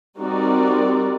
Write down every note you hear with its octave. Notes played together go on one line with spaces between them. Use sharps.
G3 C4 D#4 F#4 A#4 D5